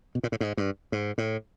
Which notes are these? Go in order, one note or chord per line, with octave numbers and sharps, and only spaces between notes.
B2
A#2
A2
G#2
G2
G#2
A2